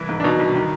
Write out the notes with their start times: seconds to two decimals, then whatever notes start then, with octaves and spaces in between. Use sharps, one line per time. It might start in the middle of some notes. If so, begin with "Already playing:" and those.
Already playing: C2 E3 E4
0.09 G#2
0.20 D4
0.24 B2 D#4
0.39 C2
0.54 D#3